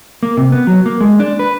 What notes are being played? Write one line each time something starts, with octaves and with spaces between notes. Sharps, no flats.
A#3
C3
B3
F#3
A#3
G#3
D4
B4